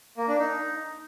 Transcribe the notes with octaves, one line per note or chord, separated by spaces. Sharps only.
A#3
D4
D#4